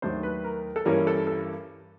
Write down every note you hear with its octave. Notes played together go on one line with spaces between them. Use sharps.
D#2 D#3 F#3 A3 D4 C5
B4
A#4
A4
G2 E3 G3 A#3 C#4 A#4
A4
A4